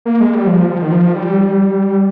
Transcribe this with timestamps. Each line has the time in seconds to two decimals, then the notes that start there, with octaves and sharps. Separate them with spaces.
0.06 A#3
0.20 G#3
0.34 G3
0.47 F3
0.70 F3
0.82 D#3
0.92 F3
1.15 G3